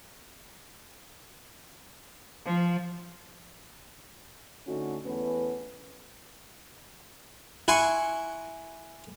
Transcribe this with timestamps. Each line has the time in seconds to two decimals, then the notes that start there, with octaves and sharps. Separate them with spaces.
2.45 F3
4.67 D3 A3 C#4 D#4 F#4
5.05 E2 A3 B3 C#4 B4
7.68 E4 F#5 G#5 C6 C#6